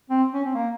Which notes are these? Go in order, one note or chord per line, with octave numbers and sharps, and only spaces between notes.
C4
C#4
C4
A#3